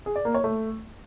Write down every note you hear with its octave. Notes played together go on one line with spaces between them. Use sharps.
G#4
D5
A#3
C#5
A3